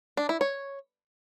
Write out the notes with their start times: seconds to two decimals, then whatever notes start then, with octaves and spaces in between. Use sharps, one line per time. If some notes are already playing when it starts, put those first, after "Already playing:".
0.17 D4
0.29 E4
0.41 C#5